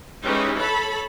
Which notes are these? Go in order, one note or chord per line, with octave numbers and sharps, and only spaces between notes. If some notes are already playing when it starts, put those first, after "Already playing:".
E3 G3 G#3 C#4 D#4 G4
A4 C#5 A5 B5